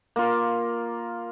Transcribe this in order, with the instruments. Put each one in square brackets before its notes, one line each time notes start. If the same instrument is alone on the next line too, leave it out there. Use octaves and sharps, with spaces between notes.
[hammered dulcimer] A#3 F4